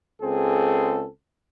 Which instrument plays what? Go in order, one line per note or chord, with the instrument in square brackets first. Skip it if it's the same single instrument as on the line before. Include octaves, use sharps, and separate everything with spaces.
[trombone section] C#2 C4 G#4 A4